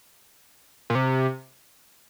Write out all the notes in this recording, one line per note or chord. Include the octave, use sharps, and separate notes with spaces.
A#2
C3